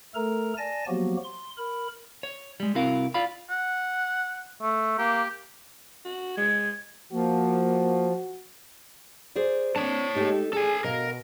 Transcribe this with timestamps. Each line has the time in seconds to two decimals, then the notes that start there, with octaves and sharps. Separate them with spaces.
0.15 A3 A4 A#4 A#5
0.58 D5 G#5 A5 A#6
0.88 F3 F#3 A#3 B3 F#4 G4
1.24 C6
1.58 A#4 B5
2.23 C#5
2.60 G3 G#3
2.75 C2 C4 E4 F#4 A#4 F5
3.14 F4 D5 F5 B5
3.50 F#5
4.62 A3
4.98 A#3 G4
6.05 F#4
6.37 G#3 G#6
7.12 F3 A#3 F#4
9.35 G#4 C5 D5
9.76 C4 D4 C#5 A5
10.15 G#3 A3 D#4 G4 A4
10.53 D4 G#4 A4 G#5
10.84 B2 A#4 D#5 F5